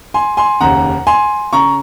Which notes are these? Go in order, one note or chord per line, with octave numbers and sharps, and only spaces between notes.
G#5 C6
G#5 C6
F1 D#2 C#3 F#5 A#5
G#5 C6
C#3 A#5 C#6